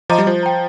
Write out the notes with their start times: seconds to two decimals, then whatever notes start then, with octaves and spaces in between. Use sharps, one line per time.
0.10 F3 D#5 A#5 D6
0.18 G3
0.27 F3 C5
0.43 G5 A#5